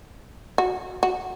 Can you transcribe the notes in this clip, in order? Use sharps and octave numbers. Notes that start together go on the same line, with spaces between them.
F#4
F#4